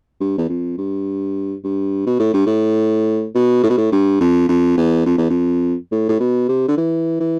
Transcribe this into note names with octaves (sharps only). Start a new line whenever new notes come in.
G2
E2
F2
G2
G2
B2
A2
G2
A2
B2
A2
B2
A2
G2
F2
F2
E2
F2
E2
F2
A2
A2
B2
C3
D3
E3
E3